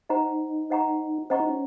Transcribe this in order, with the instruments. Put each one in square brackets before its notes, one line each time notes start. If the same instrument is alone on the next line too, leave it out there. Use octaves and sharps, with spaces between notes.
[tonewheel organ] D#4 [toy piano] C5 D#5 F#5 A#5 C#6
[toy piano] C5 D#5 F#5 A#5 C#6
[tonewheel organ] C#4 [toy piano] C5 D#5 F#5 A#5 C#6
[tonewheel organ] D#4
C#4